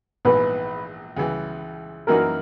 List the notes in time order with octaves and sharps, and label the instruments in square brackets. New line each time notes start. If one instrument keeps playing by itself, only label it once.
[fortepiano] A#1 G#2 E3 B3 [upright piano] B4
[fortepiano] C#2 C#3 E3
[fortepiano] F#2 E3 A#3 D#4 F#4 [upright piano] A#4